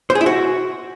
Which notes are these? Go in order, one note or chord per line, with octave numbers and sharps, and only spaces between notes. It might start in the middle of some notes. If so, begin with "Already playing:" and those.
C5
G#4
E4
F#4